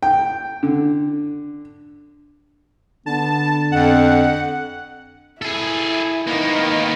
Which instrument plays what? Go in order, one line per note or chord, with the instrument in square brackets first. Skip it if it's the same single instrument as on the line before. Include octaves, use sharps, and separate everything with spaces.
[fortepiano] G5
D3
[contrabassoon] D3 [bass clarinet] B3 [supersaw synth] A5
[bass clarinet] F2 [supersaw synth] F#5
[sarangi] E4 [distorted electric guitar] G#4 A4
[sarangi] D#3 [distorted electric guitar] A#3 B3